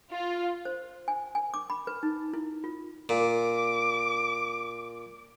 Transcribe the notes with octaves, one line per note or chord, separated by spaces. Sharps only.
F4
C5
G#5
G#5
D6
B5
B4
D#4
E4
F4
A#2 D6